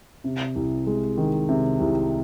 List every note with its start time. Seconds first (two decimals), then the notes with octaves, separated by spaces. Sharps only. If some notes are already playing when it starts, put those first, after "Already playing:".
0.24 C3
0.55 C2
0.87 G#3
1.17 D#3
1.49 C3
1.80 C2